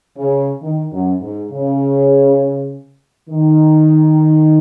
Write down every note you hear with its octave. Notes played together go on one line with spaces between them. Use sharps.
C#3
D#3
F#2
G#2
C#3
D#3